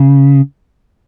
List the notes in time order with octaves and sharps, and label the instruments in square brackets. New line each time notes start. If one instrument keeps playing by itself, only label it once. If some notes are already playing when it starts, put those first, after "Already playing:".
Already playing: [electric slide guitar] C#3